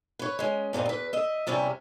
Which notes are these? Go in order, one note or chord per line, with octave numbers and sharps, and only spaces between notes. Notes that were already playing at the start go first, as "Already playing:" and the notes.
B4 C#5
G#3 C#4
G2 A#2 C4 D#4
E2 B4
D#5 E5
E2 C3 G3 C#4 E4